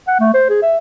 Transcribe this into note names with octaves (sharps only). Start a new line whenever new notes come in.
F#5
A3
C5
G#4
E5